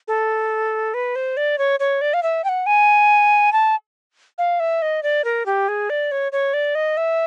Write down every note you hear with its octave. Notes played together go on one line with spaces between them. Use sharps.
A4
B4
C5
D5
C#5
C#5
D5
F5
E5
G5
F#5
G#5
A5
F5
E5
D#5
D5
A#4
G4
G#4
D5
C#5
C#5
D5
D#5
E5